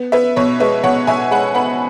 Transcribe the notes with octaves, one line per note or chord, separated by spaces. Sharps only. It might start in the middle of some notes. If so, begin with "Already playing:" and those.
Already playing: B3
B3 B4 E5
B2 C#5
G#3 B4 E5
B2 C#5 F#5
B2 E5 G#5
G#3 F#5 B5
B3 F#5 B5